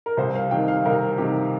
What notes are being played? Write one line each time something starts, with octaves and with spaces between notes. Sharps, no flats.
A#4
C2 C5
F5
C3 D#3 G5
F5
C2 A#4
C3 D#3 G4